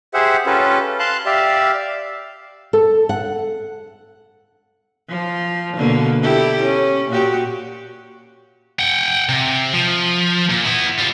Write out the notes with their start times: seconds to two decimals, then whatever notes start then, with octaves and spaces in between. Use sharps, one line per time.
0.14 G4 G#4 C5 E5 F#5
0.46 C#4 F4 G4 A4 B4
0.99 F5 A5 C6 F#6
1.26 G4 D5 E5 F5
2.73 A4
3.09 F#5
5.09 F3 F4
5.77 B2 D3 A#3
6.22 E4 G4 A4
6.62 C#4
7.10 A#2 F#4 G4
8.79 F#5 G5
9.29 C3
9.73 F3
10.50 A#2
10.65 B3 E4
10.99 G3 F4